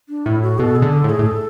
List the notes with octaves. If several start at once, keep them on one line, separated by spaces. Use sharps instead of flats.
D4
A2 E4
F#4
B2 A4
G#4
D3
A4
A2
G#4
A2
A4